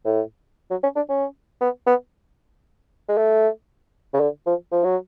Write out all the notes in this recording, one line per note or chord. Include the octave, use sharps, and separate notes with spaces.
A2
F#3
C#4
D4
C#4
B3
B3
G#3
A3
C#3
D3
F3
F3
F#3